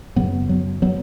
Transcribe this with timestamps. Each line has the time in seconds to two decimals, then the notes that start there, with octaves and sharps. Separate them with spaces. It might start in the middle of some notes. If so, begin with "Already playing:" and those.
0.16 F#2 C#3 F#3 B3
0.49 F#3
0.82 F#3 B3